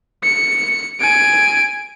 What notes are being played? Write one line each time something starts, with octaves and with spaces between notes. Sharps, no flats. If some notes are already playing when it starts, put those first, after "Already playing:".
C#7
G#5 D7